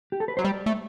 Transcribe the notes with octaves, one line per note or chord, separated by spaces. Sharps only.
G4
A4
B4
F#3 C5
G3 D5
A3